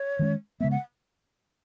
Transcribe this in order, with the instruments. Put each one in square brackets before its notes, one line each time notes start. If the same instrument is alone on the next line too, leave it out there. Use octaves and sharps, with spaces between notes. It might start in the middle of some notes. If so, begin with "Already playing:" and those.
Already playing: [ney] C#5
[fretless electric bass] D#3 G#3 C#4
[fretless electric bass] C#3 G#3 B3 [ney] E5
[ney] F#5